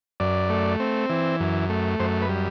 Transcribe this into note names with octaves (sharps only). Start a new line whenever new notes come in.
F#2 D5
A3
C4
E3
F#2
A3
F#2 C5
B4
G3